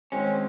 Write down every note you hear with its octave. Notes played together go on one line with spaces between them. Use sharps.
D#3 G#3 C4 C#4 F#4